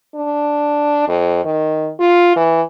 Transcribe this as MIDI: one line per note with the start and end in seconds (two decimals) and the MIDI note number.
0.15 1.07 62
1.08 1.43 41
1.45 1.91 51
2.00 2.35 65
2.36 2.62 52